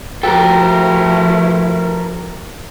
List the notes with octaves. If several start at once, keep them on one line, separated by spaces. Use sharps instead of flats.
F3 A3 E4 F#4 G4 A4 A#4 G5